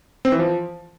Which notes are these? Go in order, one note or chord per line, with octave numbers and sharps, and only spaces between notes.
C4
E3
F3